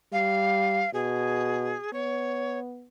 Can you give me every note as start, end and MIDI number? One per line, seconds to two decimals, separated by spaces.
0.13 0.83 55
0.13 0.90 77
0.94 1.75 47
0.94 1.93 68
1.93 2.88 59
1.93 2.59 73